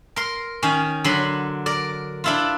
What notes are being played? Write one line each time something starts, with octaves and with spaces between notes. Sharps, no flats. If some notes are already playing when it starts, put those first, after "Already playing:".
A#4 C6
D#3 C#4
D3 F#3 B5 C6
A#4 D5
D4 E4 F4